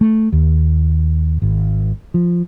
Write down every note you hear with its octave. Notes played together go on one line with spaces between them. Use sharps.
A3
D#2
G#1
F3